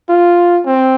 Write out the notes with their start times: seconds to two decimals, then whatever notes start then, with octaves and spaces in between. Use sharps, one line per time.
0.09 F4
0.66 C4